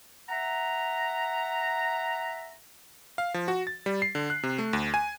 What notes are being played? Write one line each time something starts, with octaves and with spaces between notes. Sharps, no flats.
E5 F#5 A#5
F5
F3
F#4
A6
G3
C7
D3
F#6
C3
A3
D2
G#5